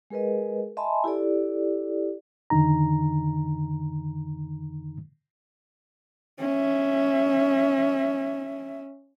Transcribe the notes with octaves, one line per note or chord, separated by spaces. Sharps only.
G#3 G#4 A#4 B4 D#5
D#5 E5 G#5 A5 B5 C6
E4 G4 A4 D5
F2 D3 D#3 D#4 A#5
C#4 E5